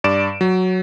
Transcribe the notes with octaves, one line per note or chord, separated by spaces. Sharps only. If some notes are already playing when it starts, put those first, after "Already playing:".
G2 D5 D7 E7
F#3